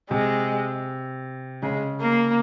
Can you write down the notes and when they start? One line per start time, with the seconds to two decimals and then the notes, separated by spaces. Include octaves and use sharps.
0.10 C3 G#3
1.62 C#3 G#3
2.01 A#3